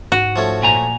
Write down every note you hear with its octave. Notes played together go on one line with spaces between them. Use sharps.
G#2 F#4
F3 A3 C#4
A#2 G#5 A#5